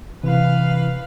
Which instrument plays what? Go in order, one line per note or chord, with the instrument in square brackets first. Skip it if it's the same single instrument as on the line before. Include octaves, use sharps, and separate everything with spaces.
[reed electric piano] C3 [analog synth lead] E3 [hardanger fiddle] B4 F5